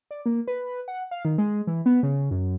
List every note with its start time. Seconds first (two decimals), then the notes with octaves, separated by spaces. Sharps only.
0.11 D5
0.26 A#3
0.48 B4
0.88 F#5
1.11 F5
1.25 D#3
1.38 G#3
1.67 E3
1.86 B3
2.03 C#3
2.31 F#2